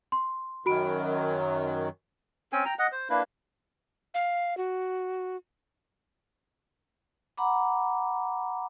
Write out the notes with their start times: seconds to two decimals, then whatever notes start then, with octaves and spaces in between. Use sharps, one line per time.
0.12 C6
0.66 F#2 D#3 F#3 F#4 B5 D7
2.53 C4 C#4 G5 G#5
2.65 G5 A#5
2.79 D#5 F#5
2.92 C5
3.10 A#3 D4 E4 B4
4.14 F5
4.57 F#4
7.38 F#5 A#5 B5 D6